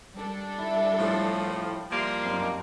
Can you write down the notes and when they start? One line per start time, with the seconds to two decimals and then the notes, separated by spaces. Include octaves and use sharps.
0.17 G3 D4 A4
0.58 E4
0.99 A2 F3
1.47 G5 C#6
1.91 F3 G3 A#3 E5 C6
2.25 F#2 C4 D#4 A5